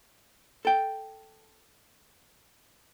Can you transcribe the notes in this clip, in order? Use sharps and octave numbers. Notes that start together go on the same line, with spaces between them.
A4 G5